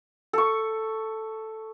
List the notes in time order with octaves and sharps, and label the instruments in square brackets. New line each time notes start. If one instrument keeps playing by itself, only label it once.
[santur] A4 C#6